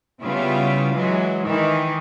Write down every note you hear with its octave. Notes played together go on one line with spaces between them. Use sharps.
C#3 G3 B3 E4 F4
E3 F#3 G#3
D#3 E3